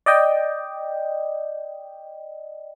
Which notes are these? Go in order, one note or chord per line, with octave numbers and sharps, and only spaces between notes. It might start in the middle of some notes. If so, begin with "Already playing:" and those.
D5 D#5 G5